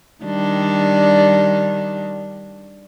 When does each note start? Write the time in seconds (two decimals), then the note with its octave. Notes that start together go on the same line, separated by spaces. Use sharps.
0.24 D#3 G3 D4